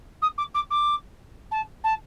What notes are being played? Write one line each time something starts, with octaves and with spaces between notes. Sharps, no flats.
D#6
D6
D6
D6
A5
A5